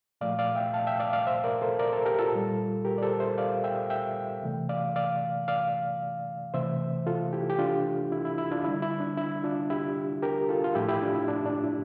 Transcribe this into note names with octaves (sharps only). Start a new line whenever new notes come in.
A#2 F3 A3 D5 F5
D5 F5
E5 G5
F5 A5
E5 G5
D5 F5
D5 F5
C5 E5
A#4 D5
A4 C5
A#4 D5
A4 C5
G4 A#4
F4 A4
A#2 G3
G4 A#4
D5
A4 C5
C5 E5
D5 F5
E5 G5
E5 G5
C3 E3 A3
D5 F5
D5 F5
D5 F5
C3 E3 A3 C5 E5
F4 A4
E4 G4
G4
D4 F4
E4
E4
E4
D4 F4
D3 G3 E4
E4
D4
E4
D4 F4
E4 G4
G4 A#4
F4 A4
F4
A2 F3 A3 E4 G4
E4 G4
D4 F4
E4
D4
D4
E4